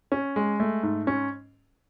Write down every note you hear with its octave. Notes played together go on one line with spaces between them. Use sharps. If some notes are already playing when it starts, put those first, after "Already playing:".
C#4
G#3
A3
G#2
C#4